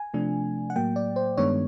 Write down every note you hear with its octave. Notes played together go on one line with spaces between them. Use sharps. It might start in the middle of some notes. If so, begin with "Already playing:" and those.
Already playing: G#5
C3 F3 A3 D4
F#5
A2 F#3 A#3 G5
D5
C5
G2 D#3 G#3 B3 D4 C#5